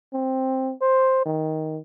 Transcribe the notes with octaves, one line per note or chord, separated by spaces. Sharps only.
C4
C5
D#3